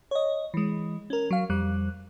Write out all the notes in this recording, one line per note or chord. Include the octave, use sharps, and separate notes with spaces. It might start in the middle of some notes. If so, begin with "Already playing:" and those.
C#5 D#5
E3 G#3
C#4 A#4
F#3 F5
F2 G3 F#6